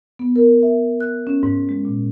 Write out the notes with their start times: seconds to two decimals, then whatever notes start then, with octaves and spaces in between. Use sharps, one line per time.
0.19 B3
0.36 A#4
0.63 E5
1.00 F#6
1.27 C#4
1.43 G#2
1.69 G#3
1.85 A#2